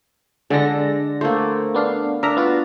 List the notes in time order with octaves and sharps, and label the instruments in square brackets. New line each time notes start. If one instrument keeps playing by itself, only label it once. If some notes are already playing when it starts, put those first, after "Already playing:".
[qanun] D3 A4 [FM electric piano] G#3 D4 A#6
[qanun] A3 A#3 [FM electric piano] C5
[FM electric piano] B3 D4 F5
[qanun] D4 [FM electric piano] A#4 E5 A#5
[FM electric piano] B3 F4 F#4